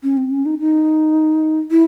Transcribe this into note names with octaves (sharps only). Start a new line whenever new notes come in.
C#4
C4
C#4
D#4
D#4
E4